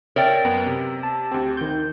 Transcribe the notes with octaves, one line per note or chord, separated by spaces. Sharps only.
A#4 C#5 D5 E5 G5 A6
F#2 B3
C3
A5
D2 C4 G4
D#3 G6